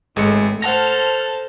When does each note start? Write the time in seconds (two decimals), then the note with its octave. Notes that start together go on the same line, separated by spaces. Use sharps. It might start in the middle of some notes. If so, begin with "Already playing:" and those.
0.16 G#1 A2 G#3 C#7
0.62 A4 C5 F#5 A5 F6 A#6